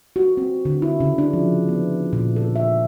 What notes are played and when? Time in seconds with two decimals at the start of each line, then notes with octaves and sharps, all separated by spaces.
0.16 F#4
0.37 C4
0.65 D3
0.82 E4
1.00 C#3
1.18 D4
1.33 F3
1.69 B3
2.13 A#2
2.36 A4
2.56 E5